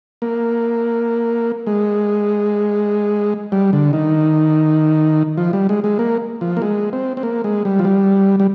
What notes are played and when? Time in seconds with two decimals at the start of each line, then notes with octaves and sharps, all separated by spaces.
0.22 A#3
1.67 G#3
3.52 G3
3.73 D3
3.93 D#3
5.37 F3
5.53 G3
5.69 G#3
5.84 G#3
5.99 A#3
6.41 F3
6.57 A#3
6.62 G#3
6.93 C4
7.17 C4
7.23 A#3
7.44 G#3
7.65 G3
7.79 F3
7.85 G3
8.40 G3